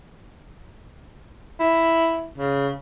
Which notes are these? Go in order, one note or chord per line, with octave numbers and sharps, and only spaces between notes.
E4
C#3